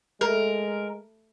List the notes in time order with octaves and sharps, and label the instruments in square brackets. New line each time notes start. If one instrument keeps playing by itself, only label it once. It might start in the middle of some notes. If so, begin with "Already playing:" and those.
[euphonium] G#3 [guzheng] A3 [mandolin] A#4